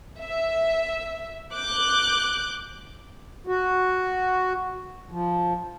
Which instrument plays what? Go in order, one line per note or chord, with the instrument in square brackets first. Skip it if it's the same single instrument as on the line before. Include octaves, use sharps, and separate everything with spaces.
[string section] E5
D6 F#6 G6
[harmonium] F#4
F3